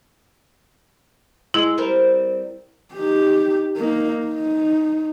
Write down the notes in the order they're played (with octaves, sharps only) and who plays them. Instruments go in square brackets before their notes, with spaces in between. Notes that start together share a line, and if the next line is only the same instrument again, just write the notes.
[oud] G#3 [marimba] E4
[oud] G3 C4 A#4
[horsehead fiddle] D#4 G4
A#3 D#4
D#4